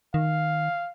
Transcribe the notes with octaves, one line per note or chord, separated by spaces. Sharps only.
D#3 F5